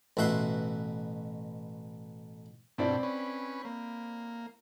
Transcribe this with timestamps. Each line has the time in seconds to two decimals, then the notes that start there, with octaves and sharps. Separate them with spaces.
0.17 A1 B2 E5 F#5 C6
2.78 G2 B2 C4 D4 E4 D5
3.03 C#4 B4
3.65 A#3